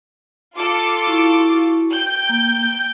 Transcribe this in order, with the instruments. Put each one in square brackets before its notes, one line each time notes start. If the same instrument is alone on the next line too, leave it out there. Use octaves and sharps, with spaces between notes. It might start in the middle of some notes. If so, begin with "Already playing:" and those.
[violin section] F4 A4 D6
[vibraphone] E4 F#4 C#6
[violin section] G5 G6
[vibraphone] A#3